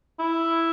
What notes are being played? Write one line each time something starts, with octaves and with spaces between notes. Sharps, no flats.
E4